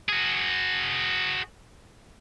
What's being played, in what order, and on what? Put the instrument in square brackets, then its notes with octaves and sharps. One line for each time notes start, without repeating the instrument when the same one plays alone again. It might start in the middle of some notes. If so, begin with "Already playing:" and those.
[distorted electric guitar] F#4 G#4